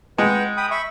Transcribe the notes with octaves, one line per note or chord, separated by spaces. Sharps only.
G#3 B4 F#5 G5
G5 B5 D#6
E5 B5 C#6